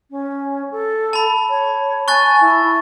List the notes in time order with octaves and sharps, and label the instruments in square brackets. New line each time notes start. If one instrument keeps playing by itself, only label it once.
[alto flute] C#4
A4
[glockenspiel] A5 B5
[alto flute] C#5
[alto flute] G#5 [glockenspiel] C#6 F#6 A6
[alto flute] E4